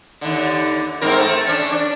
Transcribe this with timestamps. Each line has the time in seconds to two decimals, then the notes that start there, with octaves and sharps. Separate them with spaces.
0.21 D#2 D3
1.01 G#2 C4 A#4
1.19 A3
1.47 C#4 D4
1.72 D4